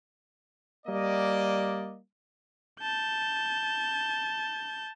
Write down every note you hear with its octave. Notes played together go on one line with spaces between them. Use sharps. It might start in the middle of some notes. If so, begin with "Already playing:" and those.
G3 A#3 D5 D#5
A5 G6